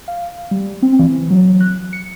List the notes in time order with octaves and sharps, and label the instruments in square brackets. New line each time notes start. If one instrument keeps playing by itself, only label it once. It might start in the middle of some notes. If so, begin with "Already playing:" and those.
[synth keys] F5
G3
C4
E3
F#3
F#6
C#7